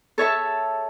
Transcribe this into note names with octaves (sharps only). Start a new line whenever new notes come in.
A4 C#5 E5 A5